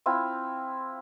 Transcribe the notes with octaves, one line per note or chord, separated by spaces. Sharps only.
C4 E4 F4